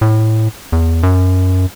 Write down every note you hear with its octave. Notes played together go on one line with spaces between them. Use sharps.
A2
E2
F#2